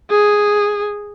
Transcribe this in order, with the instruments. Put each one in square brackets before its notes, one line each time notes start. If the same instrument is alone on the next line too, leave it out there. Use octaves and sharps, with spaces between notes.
[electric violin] G#4